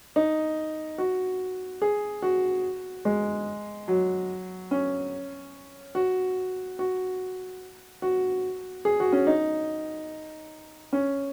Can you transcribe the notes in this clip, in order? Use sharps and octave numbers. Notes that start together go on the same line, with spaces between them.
D#4
F#4
G#4
F#4
G#3
F#3
C#4
F#4
F#4
F#4
G#4
F#4
C#4
D#4
C#4